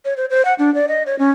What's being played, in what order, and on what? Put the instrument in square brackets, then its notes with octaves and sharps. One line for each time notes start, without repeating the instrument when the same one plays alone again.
[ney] C#5
C5
C5
F#5
D4
D5
D#5
C#5
C#4